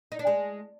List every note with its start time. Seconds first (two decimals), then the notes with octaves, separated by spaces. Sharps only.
0.12 D#4
0.19 D4
0.27 G#3